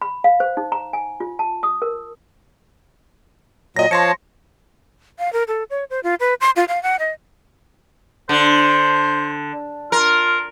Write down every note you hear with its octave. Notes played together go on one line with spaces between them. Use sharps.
B5
F5
C5
D#4
A#5
G#5
F4
A5
D#6
A#4
A#2 F#3 D#5 A#6
F3 C#5 A5 C6 A#6 C#7
F5
A#4
A4
C#5
C5
F4
B4
C6
F4
F5
F#5
D#5
D3 C5
F4 A#4